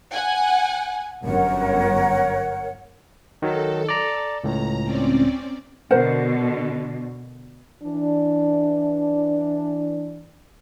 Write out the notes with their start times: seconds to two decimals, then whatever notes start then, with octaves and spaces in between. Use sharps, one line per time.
0.13 F#5 G#5
1.24 G1 F#2 A#4 C#5 F#5
3.42 D#3 F#3 A4
3.89 D5 A#5
4.44 C#2 A2 A#5
4.83 C4 C#4 D5
5.91 B2 D3 A#4 C5 F#5
7.84 E3 D4